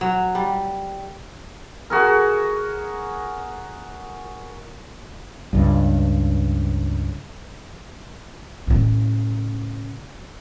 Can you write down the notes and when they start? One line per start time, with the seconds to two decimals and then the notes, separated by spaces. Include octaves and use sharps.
0.01 F#3
0.35 G3
1.90 F#4 G#4 A#4
5.53 C#2 G2
8.67 A2 C#3